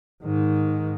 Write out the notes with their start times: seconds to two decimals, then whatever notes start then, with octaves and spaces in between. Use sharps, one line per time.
0.24 G#2 D#3